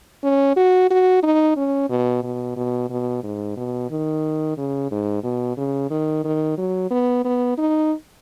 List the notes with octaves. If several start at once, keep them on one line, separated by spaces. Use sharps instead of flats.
C#4
F#4
F#4
D#4
C#4
B2
B2
B2
B2
G#2
B2
D#3
C#3
G#2
B2
C#3
D#3
D#3
F#3
B3
B3
D#4